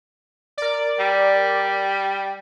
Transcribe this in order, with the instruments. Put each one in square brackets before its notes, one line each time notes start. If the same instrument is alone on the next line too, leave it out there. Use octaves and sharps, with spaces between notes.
[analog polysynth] A#4 D5
[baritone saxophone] G3